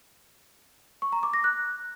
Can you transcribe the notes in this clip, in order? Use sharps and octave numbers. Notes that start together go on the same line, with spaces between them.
C#6
A#5
D6
A#6
F#6